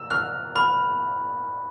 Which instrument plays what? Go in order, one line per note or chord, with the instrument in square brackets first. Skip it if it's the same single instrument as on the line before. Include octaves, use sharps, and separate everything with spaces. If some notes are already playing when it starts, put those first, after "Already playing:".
Already playing: [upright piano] E6
[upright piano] F6 [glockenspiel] F#6
[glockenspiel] B5 [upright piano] F6